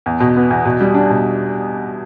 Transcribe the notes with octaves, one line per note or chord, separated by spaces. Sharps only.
E2
B2
B3
E2
B2
G3
D4
B2